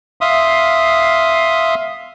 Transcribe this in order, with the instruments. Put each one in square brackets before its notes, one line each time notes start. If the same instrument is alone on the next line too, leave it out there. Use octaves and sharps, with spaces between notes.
[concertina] E5 F5 C6 D#6